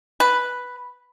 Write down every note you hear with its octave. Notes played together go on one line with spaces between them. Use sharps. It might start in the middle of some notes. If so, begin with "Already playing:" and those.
B4